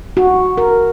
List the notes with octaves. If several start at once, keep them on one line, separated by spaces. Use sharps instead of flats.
F#4
A#4